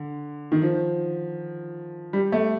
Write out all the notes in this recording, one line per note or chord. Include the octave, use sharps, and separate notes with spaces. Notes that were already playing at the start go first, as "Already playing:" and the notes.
Already playing: D3
D#3
F3
G3
A3